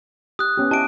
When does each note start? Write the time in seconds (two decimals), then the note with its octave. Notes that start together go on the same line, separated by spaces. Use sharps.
0.39 G4 D#6 F#6
0.57 B3 C#4 G4
0.71 E4 G4 D#5 A5 D7